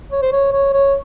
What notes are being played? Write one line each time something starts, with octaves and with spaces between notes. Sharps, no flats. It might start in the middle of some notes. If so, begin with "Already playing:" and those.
C#5
C5
C#5
C#5
C#5